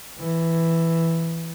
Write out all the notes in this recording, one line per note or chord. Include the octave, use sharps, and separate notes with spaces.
E3